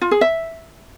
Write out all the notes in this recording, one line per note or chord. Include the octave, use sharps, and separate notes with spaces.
F4
G#4
E5